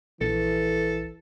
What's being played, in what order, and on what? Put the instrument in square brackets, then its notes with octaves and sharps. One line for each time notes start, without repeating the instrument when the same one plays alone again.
[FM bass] A#1 [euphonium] E3 [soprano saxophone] A4